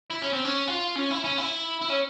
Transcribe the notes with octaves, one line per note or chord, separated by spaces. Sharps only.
E4
C#4
C4
C#4
F4
C#4
E4
C#4
E4
E4
C#4